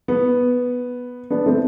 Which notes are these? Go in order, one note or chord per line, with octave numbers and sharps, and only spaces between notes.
B3
B3 D4
A3 C4